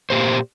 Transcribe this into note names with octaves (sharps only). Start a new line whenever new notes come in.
A#2 A#3 G4 C5